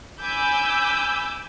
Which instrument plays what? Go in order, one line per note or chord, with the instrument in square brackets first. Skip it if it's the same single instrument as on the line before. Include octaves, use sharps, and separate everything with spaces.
[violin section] G#5 B5 D6 E6 G6